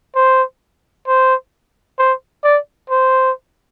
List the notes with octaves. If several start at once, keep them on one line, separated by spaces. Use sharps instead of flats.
C5
C5
C5
D5
C5